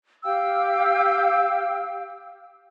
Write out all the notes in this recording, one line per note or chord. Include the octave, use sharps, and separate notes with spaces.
G4 F5 G5 E6